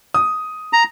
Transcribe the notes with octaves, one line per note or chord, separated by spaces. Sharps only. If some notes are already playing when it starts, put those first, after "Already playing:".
D#6
A#5